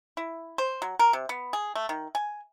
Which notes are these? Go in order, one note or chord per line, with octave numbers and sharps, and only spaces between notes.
E4
C5
F#3
A#4
C3
B3
G#4
A3
D#3
G#5